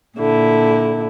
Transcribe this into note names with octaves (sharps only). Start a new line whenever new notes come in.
A#2 D3 E4